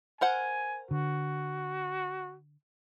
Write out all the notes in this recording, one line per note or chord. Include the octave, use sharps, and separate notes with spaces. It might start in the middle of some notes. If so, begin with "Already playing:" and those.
A#4 C5 F#5 G#5
D3 F#4